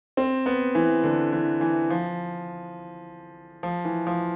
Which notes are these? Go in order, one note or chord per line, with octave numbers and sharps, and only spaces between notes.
C4
B3
E3
D3
E3
E3
F3
F3
E3
F3